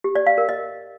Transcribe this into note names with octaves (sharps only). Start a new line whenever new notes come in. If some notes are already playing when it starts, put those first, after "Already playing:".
G4
D5
F5
A#4
D#5